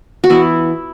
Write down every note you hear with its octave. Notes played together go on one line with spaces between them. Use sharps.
F#4
E3 B3 E4